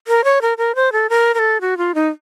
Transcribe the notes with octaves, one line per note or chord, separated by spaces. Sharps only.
A#4
C#5
A#4
A#4
C5
A4
A#4
A#4
A4
F#4
F4
D#4